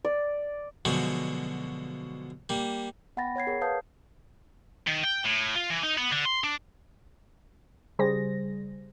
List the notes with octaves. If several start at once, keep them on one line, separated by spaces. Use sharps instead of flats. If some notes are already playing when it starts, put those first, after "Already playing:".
D5
B2 D3 F3 F#3 G#3
G3 A#3
B3 F#5 G5 B5 A6 A#6
C#5 F#5 G#6 C7
G#4 A#4 C#5
B4 F5 A5 D#6 G6
D#3
G5
A2
F4
E3
D#4
B3
D3
C6
D4
C#3 G3 G#4 C5 A#6